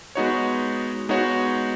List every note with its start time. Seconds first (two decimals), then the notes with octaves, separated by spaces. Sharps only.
0.15 G#3 B3 D#4 F#4 C#5
1.09 G#3 B3 D#4 F#4 C#5